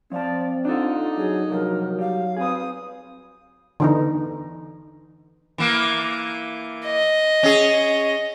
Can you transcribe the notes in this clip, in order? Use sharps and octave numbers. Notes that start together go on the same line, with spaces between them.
F3 C4 D5 F5 A5
D4 D#4 F4 A4
F#3 G#4
C2 F3 F#3 A#4
G3 F5
C4 G#4 B4 D#6
D3 E3 D#4
E3 A#3
D#5
C#4 G#4